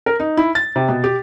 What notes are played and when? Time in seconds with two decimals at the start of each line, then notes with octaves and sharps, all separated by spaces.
0.06 A#4
0.20 D#4
0.37 E4
0.55 A6
0.76 C3
0.89 B2
1.04 G4